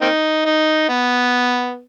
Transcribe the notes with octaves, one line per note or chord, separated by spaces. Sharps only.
A#3 C4 D#4
D#4
B3